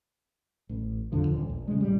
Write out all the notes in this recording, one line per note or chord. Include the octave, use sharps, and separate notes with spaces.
A1
F2 A#2 D3 F3
D#1
A#1
C#3 G#3
A2 G3